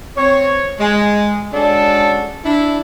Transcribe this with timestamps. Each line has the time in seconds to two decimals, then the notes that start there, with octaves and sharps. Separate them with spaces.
0.16 C4 C#5
0.78 G#3
1.53 G#3 C#4 D4 F#4 A4
2.44 D4 E4